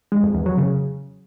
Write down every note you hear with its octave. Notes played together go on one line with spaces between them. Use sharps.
G#3
F2
E2
F#3
C#3